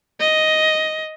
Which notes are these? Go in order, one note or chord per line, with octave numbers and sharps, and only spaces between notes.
D#5